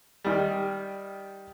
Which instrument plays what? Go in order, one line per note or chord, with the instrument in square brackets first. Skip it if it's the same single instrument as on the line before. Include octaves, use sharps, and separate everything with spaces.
[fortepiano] D#3 G3